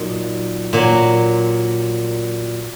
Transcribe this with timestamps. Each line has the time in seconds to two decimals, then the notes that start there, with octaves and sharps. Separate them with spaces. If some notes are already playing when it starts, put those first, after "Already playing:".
Already playing: A#2 F#3 D#4
0.73 A#2 F#3